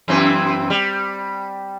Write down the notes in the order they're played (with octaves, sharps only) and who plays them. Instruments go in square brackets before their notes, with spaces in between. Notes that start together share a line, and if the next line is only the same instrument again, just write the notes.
[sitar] F#2 E3 C4
G3